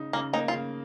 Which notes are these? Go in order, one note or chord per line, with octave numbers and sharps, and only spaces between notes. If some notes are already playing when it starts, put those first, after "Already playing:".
Already playing: C#3 D#4
C#3 A#3
A#3 D#4
F4
C#3